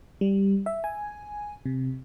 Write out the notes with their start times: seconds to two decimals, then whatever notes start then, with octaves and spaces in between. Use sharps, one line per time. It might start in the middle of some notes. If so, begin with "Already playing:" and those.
0.21 G3
0.66 E5
0.84 G#5
1.66 C3